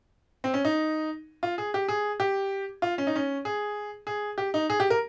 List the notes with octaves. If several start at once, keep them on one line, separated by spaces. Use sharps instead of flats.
C4
C#4
D#4
F4
G#4
G4
G#4
G4
F4
C#4
D#4
C#4
G#4
G#4
G4
D#4
G#4
G4
A#4